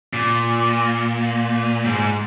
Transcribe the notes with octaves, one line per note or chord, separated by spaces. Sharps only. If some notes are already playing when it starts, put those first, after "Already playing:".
A#2
G#2